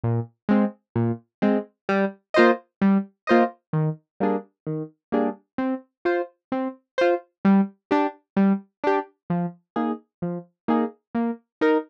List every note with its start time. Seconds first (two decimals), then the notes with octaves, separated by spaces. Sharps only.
0.04 A#2
0.49 G#3 C4
0.96 A#2
1.42 G#3 C4
1.89 G3
2.34 A#3 F4 C5 D#5
2.81 G3
3.27 A#3 F4 C5 D#5
3.73 D#3
4.20 G3 A#3 D4 G#4
4.67 D#3
5.12 G3 A#3 D4 G#4
5.58 C4
6.05 F4 C5
6.52 C4
6.98 F4 C5
7.45 G3
7.91 D4 G4
8.37 G3
8.84 D4 G4
9.30 F3
9.76 A#3 D#4 G#4
10.22 F3
10.68 A#3 D#4 G#4
11.15 A#3
11.61 D#4 A#4